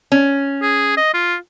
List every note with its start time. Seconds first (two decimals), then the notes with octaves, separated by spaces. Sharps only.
0.12 C#4
0.62 G#4
0.97 D#5
1.14 F4